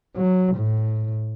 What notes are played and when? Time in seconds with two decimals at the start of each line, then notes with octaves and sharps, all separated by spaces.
0.16 F#3
0.55 A2